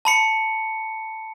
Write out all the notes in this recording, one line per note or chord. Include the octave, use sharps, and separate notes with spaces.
A5 B5 C#7